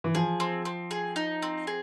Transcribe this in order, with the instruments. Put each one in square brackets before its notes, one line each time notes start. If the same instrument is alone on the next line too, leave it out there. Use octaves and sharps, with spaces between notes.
[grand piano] E3
[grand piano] F3 [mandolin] G#4
[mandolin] C4
C4
G#4
D#4
C4
G#4